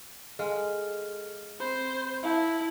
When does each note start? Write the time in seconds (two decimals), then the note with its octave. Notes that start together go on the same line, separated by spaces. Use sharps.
0.39 G#3 A4 F5 F6
1.60 C4 C5 B5
2.23 E4 E5 F5 A5